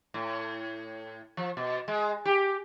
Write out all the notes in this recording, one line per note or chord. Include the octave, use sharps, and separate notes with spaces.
A2
F3
B2
G#3
G4